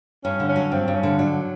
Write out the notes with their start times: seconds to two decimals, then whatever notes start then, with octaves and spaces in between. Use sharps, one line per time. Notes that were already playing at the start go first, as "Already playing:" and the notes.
0.24 G2 C#4
0.40 D3
0.49 C#4
0.56 F#3
0.72 G2 C4
0.88 G2
0.95 C#4
1.03 D3
1.18 F#3 D4